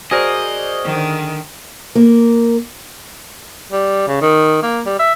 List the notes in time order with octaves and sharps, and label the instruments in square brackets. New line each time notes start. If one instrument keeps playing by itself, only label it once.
[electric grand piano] F#4 C5 D5 [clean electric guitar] G#4 A#4 [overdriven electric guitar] D#5
[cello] D3 D#3
[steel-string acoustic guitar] A#3
[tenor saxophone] G3
C#3
D#3
A#3
G3
E5